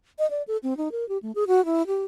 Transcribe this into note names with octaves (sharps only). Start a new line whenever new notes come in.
D#5
D5
A4
C4
D#4
A#4
G4
A3
G#4
F#4
E4
G4